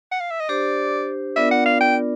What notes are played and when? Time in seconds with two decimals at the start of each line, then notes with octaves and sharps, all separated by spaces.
0.11 F#5
0.21 F5
0.31 E5
0.40 D#5
0.49 D4 G4 C5 D5
1.36 B3 D4 F4 A#4 D5 E5
1.51 F#5
1.65 F5
1.81 G5